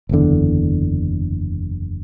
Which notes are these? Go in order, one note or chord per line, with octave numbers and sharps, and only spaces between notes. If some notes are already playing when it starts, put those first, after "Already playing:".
F#1 E2 D3